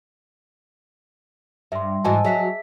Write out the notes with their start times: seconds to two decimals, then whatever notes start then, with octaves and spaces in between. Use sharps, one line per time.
1.72 G2 E5 C6
2.05 G#2 E3 F#4 D#5 G#5 A5
2.25 F#3 F#4 G#4 E5 B6